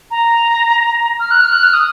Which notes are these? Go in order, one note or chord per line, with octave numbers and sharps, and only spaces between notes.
A#5
F6
F#6
F6
F#6
F6
D#6